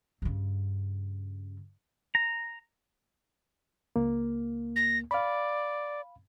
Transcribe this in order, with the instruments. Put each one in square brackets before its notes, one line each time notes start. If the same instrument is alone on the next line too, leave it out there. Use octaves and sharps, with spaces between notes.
[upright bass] G2 C#3
[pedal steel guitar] A#5
[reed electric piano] C#2 A#3
[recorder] A#6
[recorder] D5 [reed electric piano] F5 B5